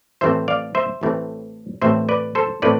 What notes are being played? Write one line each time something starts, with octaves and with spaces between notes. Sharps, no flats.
A1 A2 E3 A3 C4 C5 E5
D5 F5
C5 E5
A1 A2 E3 A3 C4
A1 A2 E3 A3 C4 C5 E5
B4 D5
A4 C5
A2 E3 A3 C4 B4 D5